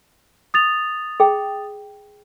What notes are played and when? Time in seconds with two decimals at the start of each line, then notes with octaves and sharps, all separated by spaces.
0.54 D#6 A6 F7
1.20 G#4 G5